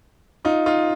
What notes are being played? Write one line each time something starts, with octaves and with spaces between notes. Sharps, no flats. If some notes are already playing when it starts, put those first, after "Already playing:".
D#4 F4
D#4 F4